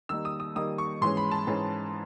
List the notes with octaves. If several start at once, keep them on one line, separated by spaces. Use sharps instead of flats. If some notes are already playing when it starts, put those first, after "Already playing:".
D#3 G3 A#3 D#4 E6
D#6
D#6
D#3 G3 A#3 D#4 D#6
C#6
G#2 E3 G#3 C#4 C6
B5
A5
G#2 E3 G#3 C#4